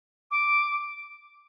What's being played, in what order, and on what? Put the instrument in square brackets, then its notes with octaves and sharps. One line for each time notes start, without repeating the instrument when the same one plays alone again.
[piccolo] D6